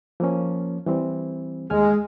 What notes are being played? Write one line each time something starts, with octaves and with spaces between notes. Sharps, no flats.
F3 A#3 C#4
E3 G3 C4
D#2 G#3 G#5 F6